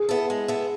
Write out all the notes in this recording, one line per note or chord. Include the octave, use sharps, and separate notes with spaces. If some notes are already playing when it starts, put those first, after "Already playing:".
Already playing: G#4
B3 E4 A4
G#3
B3 E4 A4